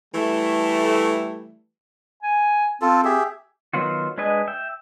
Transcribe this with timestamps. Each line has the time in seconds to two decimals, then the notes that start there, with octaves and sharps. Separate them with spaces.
0.15 E3 G3 A3
2.23 G#5
2.82 C4 F4 A4
3.05 G4 G#4 E5
3.73 D#3 F#3 B3 F4 F#4
4.18 G#3 D4 B4 D#5 G#5
4.48 E5 G5